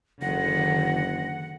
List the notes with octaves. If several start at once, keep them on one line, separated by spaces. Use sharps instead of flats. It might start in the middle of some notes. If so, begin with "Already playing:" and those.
F#1 D3 D#3 F#5 A#6